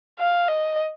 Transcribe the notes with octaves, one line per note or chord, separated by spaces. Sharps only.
F5
D#5